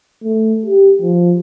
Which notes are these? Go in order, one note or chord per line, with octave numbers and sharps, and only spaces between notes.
A3
G4
F3